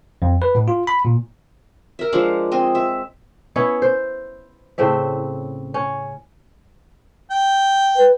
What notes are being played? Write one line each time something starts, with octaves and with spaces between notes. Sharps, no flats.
F2
B4
A2
F4
B5
A#2
A#4 E5
F3 G#3 D4 F5
C4 D#5 G#5
E5
B3 C#4 E4
C5
A2 C#3 C4 E5
C#4
G5
B4